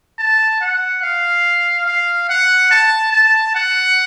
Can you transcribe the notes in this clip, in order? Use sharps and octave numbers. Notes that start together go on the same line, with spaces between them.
A5
F#5
F5
F5
F#5
A5
A5
F#5